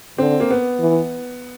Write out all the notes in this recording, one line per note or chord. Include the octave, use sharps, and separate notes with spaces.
D3 C4
A#3
B3
E3